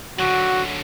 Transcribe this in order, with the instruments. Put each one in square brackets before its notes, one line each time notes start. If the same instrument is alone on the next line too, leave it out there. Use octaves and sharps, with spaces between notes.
[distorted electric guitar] D3 F#3 [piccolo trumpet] F#4